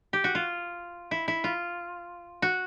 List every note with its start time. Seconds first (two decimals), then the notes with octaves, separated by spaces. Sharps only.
0.13 G4
0.24 F#4
0.35 F4
1.11 E4
1.28 E4
1.44 F4
2.42 F#4